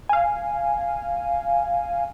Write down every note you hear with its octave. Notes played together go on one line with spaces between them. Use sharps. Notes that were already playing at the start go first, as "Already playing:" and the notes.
F5 G#5